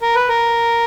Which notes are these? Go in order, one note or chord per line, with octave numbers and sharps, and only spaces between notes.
A#4
B4
A#4